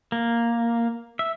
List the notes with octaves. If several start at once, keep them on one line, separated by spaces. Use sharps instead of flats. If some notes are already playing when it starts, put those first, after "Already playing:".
A#3
E5